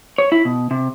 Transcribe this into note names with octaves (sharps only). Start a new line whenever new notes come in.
C#5
E4
B2
C3